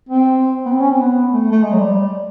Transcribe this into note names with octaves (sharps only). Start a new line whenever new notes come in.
C4
B3
C4
C#4
C4
B3
A3
A3
G#3
F#3
G3